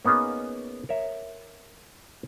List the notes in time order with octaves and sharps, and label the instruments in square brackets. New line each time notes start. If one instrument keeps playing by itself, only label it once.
[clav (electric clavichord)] A#3 B3 C#4 D#4 G#4
A#4 C#5 E5